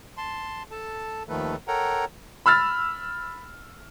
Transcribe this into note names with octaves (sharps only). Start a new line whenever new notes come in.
A5 C6
A4 A5
D#2 D#3 F3 A3 A4 B4
A4 A#4 C#5 F#5 G5 A#5
B5 E6 F6 A6